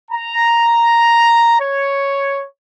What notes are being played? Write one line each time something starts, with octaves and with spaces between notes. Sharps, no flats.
A#5
C#5